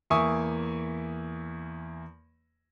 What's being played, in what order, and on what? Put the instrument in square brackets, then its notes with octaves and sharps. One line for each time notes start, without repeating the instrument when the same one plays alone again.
[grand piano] E2 A#3 E5 G#5 C#6 D#6